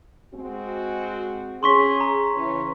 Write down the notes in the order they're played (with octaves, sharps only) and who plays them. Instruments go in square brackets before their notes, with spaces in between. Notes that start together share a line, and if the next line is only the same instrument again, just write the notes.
[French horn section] G#3 C4 F#4
[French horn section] C#4 G#4 [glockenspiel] C6 C#6 B6
[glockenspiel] A#5
[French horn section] C#3 E3 C#4